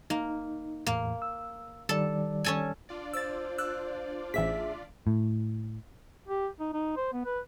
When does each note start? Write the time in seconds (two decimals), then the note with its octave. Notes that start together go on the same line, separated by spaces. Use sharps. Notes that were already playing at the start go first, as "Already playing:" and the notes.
0.10 A#3 D#4
0.86 E2 A2 A#3
1.22 E6
1.89 D#3 G3 A4 D5
2.44 C#4 A4 G#5
2.89 D4 F4 D5
3.14 C5 E6 A6
3.58 E6 F#6
4.34 A1 G#4 E5 B6
5.07 A2
6.28 G4
6.60 D#4
6.74 D#4
6.97 C5
7.13 B3
7.25 B4